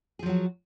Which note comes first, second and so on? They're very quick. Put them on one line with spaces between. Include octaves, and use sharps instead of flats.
G#4 F3 F#3 F#4